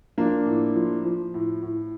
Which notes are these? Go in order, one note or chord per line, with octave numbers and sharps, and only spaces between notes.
F3 A#3 D4
A2
F3
F3
A2
A2